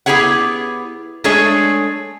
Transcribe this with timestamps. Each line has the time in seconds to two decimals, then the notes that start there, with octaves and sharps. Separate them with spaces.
0.06 B3 E4 G4 G#4 C#5 F#5
1.24 G#3 A3 D4 G#4 C#5